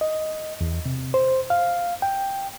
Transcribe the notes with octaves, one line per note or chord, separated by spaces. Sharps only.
D#5
E2
C3
C5
F5
G5